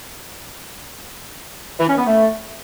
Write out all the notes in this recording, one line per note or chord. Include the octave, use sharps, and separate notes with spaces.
E3
C#4
B3
A3